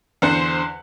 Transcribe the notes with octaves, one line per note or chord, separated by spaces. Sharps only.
E2 D3 C5 F#6 C#7